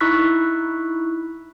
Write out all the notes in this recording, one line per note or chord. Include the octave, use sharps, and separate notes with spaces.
D#4 E4 C#6 E6 F#6 B6